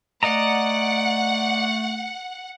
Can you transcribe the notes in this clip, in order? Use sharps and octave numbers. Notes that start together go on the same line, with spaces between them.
A3 D5 D#5 F#5 A#5